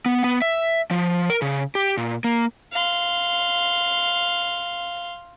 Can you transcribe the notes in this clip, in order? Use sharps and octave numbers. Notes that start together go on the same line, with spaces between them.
B3
B3
E5
F3
A#4
C#3
G4
A#2
A#3
F5 C6